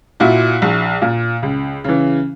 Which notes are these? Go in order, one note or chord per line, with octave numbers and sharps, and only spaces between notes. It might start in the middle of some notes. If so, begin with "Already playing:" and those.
A#2 E4 F#4
A#1
A#2
C#2
C#3 E3